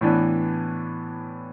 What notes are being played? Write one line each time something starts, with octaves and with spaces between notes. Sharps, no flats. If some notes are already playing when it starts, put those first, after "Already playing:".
A2 E3 B3 D4